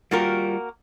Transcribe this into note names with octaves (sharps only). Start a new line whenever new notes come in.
G3 A#3 F4 F#4 A#4 G5